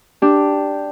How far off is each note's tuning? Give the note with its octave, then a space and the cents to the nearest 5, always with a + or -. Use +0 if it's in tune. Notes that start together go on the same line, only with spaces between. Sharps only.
D4 +0 G4 +0